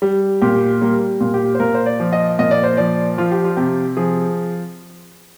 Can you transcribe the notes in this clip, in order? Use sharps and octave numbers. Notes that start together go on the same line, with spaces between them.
G3
A#2 G4
G3 A#3
A#2
G4
C5
A#2 A#4
C5
D5
F3
D#5
A#2 D#5
D5
C5
F3 D5
F3 F4
G4
F4
C3 G4
F3 G#4